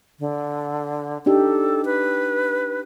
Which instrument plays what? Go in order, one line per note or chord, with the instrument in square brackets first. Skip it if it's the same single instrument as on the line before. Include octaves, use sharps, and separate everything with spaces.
[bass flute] D3
[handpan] D4 D#4 G4 [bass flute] A4
[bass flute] B4